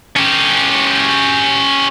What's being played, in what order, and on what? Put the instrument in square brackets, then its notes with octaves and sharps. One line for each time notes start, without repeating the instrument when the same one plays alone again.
[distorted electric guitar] C#4 G4